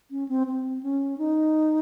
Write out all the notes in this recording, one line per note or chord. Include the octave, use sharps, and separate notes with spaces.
C#4
C4
C4
C#4
D#4